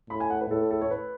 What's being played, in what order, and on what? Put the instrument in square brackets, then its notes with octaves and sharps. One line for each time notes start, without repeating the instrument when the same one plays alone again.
[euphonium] A2 [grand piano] B5
[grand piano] G#5
F#5
B4
[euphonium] A2 [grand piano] A4
[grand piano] A4
C#5
B4